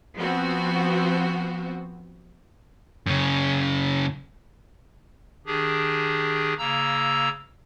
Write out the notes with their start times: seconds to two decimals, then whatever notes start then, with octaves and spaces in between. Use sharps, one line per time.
0.16 F3 B3 C4 F#4
3.06 F#2 C#3
5.46 D#3 D4 G4 G#4
6.58 C#3 A#3 A#5 E6